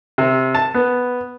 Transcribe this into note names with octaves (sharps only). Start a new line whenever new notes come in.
C3
A5
B3